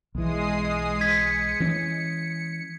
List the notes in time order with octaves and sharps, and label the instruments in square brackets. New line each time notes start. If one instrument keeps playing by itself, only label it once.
[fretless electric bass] B1 E3 [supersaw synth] G#3 D#6 C7
[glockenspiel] G#6 B6 [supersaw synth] C#7
[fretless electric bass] E3 C#4